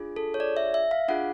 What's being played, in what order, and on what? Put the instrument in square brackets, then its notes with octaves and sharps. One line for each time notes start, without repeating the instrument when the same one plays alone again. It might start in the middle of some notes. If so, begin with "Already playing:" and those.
Already playing: [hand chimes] D4 F4 G#4
A4
C#5
D5
E5
E5
F5
D4 F4 G#4 F#5